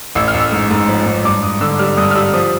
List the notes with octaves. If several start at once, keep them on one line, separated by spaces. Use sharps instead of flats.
A1 E6
F6
A1
E6
G#2
G#2
F3
G#2
G2 D6
G2 D#6
D3 E6
G3 F6
G2 D#6
F6
G3 E6
F3 D#6